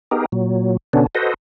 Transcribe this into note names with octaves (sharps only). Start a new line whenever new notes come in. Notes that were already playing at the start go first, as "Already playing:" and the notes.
B3 D#4 G4 G#4 A#4
A#2 F#3
B2 D3 B3 C#4 D4
F#4 A4 B4 C5 D#5